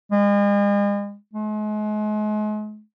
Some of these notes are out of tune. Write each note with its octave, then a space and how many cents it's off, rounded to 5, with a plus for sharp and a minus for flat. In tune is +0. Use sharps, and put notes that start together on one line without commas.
G#3 -40
G#3 +40